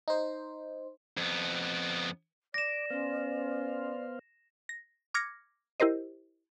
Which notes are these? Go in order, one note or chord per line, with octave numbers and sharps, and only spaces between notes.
D#4 C5
F2 B3
D5 D6 A#6 E7
B3 C#4 C5 F5
A#6
D6 F6 G#6 A#6 C#7
E4 G4 A#4 C5 D#5